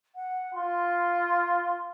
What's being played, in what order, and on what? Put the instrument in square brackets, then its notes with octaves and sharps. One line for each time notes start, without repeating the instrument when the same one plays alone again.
[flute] F#5
[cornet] F4 [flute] C6